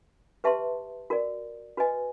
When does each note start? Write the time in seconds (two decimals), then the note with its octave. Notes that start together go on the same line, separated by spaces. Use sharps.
0.44 G4 B4 E5 A5 C6
1.10 F#4 A#4 D5
1.77 F#4 B4 D#5 G#5